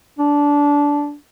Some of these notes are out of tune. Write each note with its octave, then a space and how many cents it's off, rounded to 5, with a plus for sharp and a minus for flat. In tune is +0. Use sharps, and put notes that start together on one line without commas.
D4 -15